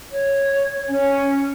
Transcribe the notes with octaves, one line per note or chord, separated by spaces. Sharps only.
C#5
C#4 G#5